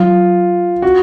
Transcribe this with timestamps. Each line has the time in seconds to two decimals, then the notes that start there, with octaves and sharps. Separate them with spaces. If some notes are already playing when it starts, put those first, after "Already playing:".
Already playing: F#3 F4
0.82 F#4